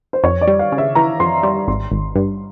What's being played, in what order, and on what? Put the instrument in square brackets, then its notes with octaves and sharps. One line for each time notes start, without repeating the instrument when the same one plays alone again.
[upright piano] C5
[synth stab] F2 [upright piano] C#5
[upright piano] D5
[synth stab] G3
[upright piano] F5
[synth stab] C#3
[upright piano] E5
[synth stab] E3 [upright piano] A#5
[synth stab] F2 [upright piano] C6
[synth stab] G3 [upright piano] C6
[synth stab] G#1 [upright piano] C6
[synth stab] G#1
G2